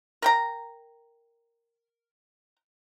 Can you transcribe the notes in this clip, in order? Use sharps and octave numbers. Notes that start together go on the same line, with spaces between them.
A#4 G5 A#5